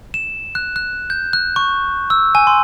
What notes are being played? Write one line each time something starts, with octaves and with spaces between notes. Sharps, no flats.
E7
F#6
F#6
G6
F#6
C#6
E6
G#5
C6